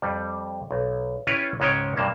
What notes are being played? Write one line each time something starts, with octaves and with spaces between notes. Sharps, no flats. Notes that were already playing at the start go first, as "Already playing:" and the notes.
F2 G3
B1
C#4 E4 F4 G4 B4 C#5
C#2 G#2 G#3 C#4 C#5 G5
G2 C3 A#3 A5